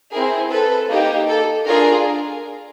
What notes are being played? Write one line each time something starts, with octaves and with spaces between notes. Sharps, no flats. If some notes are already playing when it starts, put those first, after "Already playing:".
C4 E4 G#4 A#4
A4 B4
A#3 D#4 G4
A4
D4 F4 G#4 A#4